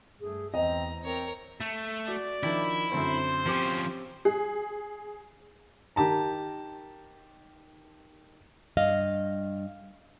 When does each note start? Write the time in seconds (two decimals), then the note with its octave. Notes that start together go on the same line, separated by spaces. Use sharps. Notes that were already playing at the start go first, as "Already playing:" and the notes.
0.21 G2 A3 G#4
0.54 E2 C4 D#5 A#5
1.03 C4 A#4 C#5
1.61 A3
2.08 F#4 D5
2.43 D#3 F3 D4 E4
2.92 F#2 D3 C4 C5
3.46 F3 C4 C#4 G4 D6
4.25 G#4
5.96 D#3 G4 A5 A#5
8.77 G2 D#5 F5